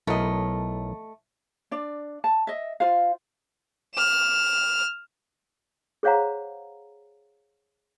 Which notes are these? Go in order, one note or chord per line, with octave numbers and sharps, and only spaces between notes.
B1 A3 E4 A#4 D#5
D4 D5
A5
D#5 E5
F4 C5 F5
F6 E7
G#4 C5 C#5 F5 F#5 A#5